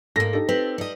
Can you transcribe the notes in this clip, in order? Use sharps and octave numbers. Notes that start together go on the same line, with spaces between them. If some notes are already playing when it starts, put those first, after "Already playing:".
G#2 A#3 A4 A#6
D#4 G4 A4
C4 B4
G3 D#5